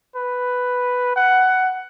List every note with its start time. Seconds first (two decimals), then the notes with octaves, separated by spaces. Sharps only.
0.15 B4
1.16 F#5